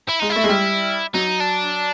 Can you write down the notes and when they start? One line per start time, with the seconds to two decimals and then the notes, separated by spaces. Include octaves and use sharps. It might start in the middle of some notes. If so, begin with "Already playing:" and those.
0.08 E4
0.19 G#3 D#4
0.29 E4
0.36 A3
0.44 G#3
0.48 G3
1.14 F#3 D#4
1.40 D4